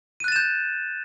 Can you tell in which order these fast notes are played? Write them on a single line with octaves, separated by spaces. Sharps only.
D#7 F#6 A6 E7 G6